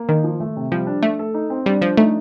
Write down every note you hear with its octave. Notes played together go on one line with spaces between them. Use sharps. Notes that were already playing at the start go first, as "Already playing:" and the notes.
Already playing: A#3
D#3 D#4
F3
A3
C3
F3 G3
D4
A3 A4
A4
D#4
C4
G3 D4
F3 D4
A3 D#4